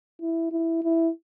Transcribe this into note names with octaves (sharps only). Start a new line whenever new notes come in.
E4
E4
E4